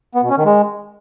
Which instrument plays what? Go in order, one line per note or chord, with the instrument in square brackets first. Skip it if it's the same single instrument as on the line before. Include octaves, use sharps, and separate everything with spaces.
[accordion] B3
B2
C#4
D#3
G#3